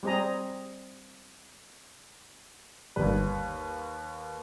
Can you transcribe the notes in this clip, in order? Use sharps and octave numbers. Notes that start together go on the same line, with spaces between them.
G3 C4 G#4 D#5 A#5
G1 D#2 D#3 G3 B4